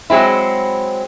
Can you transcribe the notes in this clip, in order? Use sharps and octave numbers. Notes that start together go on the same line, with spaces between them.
F#3 G#3 C4 E4